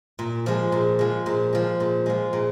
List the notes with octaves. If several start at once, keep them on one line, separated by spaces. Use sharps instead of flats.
A#2
F3 G#3
A#2
F3 G#3
A#2
F3 G#3
A#2
F3 G#3
A#2